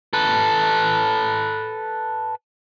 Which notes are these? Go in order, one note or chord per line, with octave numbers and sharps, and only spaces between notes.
A4 B4